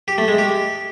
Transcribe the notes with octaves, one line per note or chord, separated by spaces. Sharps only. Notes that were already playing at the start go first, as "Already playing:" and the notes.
G4
A3
G#3
G4